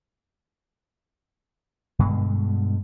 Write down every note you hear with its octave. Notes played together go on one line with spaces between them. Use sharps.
G2 B2 D3 G#3